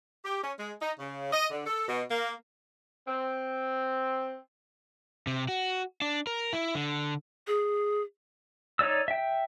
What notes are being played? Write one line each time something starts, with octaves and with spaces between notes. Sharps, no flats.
G4
C#4
G#3
D#4
C#3
D#5
D3
A4
B2
A#3
C4
C3
F#4
D4
A#4
E4
D3
G#4
D#4 C#5 D5 E6
E5 G5